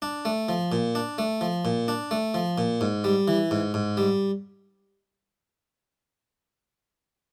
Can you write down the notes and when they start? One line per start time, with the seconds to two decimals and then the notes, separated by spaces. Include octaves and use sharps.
0.02 D4
0.25 A3
0.49 F3
0.72 A#2
0.95 D4
1.18 A3
1.41 F3
1.65 A#2
1.88 D4
2.11 A3
2.34 F3
2.58 A#2
2.81 G#2
3.04 G3
3.28 E3
3.51 G#2
3.74 G#2
3.97 G3